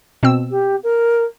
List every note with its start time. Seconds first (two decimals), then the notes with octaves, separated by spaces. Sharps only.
0.23 B2 C4 E6
0.50 G4
0.83 A#4